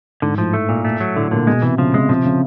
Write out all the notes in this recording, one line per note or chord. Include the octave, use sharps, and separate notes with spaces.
G#2 D3
A2 F3
A3
A#2
A3
F#3
A2 D3
A#2 D3
B2 G#3
C3 E3
C#3 F3
C3 G#3
C3 F3
C#3